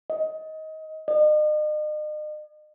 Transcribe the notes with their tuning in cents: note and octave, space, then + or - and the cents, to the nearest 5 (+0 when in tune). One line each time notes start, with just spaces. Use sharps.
D#5 +20
D#5 -40